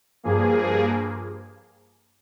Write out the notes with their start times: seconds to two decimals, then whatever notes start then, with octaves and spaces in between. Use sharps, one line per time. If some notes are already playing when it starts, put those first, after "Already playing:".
0.24 G2 F3 A#3 G#4